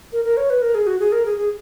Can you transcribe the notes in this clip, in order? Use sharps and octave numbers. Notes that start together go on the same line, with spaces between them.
A#4
A#4
C#5
B4
A#4
G#4
F#4
G#4
A#4
G#4
G#4